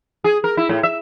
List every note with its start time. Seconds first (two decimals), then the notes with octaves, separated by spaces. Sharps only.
0.24 G#4
0.44 A#4
0.57 E4
0.69 A2
0.83 E5